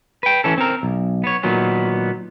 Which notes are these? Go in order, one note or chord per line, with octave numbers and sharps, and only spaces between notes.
B4 G5
E3 C#4 A4
C4 A#4
B1
B3 C#5
A#2 D#3 F#3 B3